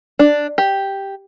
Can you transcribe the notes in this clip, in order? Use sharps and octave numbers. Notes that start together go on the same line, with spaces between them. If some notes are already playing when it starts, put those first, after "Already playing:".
D4
G4